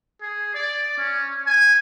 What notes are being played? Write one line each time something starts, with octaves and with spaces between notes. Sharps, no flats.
G#4
D5
C#4
G#5